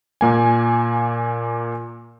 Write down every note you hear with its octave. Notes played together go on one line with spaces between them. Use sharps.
A#2 A#3 G#5